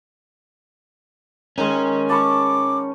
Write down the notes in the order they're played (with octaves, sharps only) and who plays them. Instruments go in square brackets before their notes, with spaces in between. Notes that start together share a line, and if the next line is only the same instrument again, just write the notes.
[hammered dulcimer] D#3 G#3 [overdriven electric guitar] C#4
[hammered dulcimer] A5 B5 C#6 [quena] D6